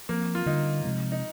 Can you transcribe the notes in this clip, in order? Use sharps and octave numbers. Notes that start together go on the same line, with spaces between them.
F3 A#3 C4
F4
D3 G3 D4 D#4
C3 F3 G#3 C4
D#4